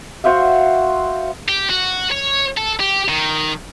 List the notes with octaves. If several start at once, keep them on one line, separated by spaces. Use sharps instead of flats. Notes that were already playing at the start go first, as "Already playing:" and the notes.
F#4 C5 E5 F5
G4
F#4
C#5
A4
G4
D#3